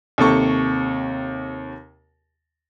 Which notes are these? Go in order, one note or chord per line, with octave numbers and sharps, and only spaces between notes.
D#2 C3 A4 C#6